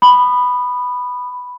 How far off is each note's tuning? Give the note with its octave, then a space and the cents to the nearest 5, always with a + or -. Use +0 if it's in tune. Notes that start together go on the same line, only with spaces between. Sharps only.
B5 +0 D#6 -30